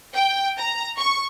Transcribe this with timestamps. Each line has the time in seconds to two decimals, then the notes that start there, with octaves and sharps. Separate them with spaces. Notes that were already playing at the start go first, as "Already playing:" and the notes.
0.14 G5
0.60 A#5
0.98 C#6